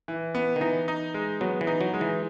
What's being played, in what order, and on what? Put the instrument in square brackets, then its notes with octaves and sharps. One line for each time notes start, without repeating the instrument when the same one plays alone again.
[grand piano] E3
B3
[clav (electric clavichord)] D#3
[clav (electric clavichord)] E3 [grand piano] D#4
[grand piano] D#4
G#3
[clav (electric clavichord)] F#3 [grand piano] B3
[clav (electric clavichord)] E3
[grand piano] D#4
[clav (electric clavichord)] F#3
[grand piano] G#3
[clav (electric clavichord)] E3